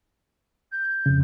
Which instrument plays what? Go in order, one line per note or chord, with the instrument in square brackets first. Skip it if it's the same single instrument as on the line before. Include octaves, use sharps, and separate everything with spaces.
[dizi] G6
[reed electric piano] F2 C#3